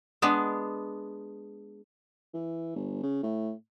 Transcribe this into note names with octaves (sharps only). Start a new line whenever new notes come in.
G#3 B3 D4
E3
G1
C#3
A2